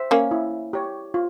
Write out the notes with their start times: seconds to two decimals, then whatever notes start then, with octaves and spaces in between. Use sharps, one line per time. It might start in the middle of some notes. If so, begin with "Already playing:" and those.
Already playing: C5 E5
0.11 A#3 C#4
0.31 E4
0.73 G4 C#5
1.14 F4